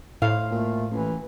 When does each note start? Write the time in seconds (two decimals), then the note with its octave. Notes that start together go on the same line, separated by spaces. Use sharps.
0.22 A2 C5 F5
0.51 A#2 A3
0.92 A1 E3